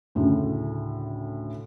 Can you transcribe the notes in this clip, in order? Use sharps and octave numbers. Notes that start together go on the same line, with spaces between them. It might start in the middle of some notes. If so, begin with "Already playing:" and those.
D2 A2 C#3